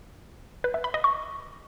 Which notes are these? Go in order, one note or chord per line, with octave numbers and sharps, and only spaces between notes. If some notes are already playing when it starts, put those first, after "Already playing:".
B4
E5
B5
D#5
C#6